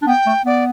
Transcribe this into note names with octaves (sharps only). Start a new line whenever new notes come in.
D4
B3 G5
A3
B3 D5